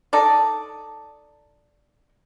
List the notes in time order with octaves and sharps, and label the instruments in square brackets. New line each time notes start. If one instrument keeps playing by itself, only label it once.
[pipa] D#4 A4 D5